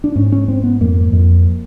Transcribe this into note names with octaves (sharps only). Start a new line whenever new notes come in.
D4
G#2 C#4
C#4
G#2 C4
B3
F2 A#3
F2